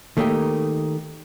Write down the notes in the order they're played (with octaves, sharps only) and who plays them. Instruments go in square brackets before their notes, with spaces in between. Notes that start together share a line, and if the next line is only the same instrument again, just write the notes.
[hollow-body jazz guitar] D#3 A3 A#3 D#4 G4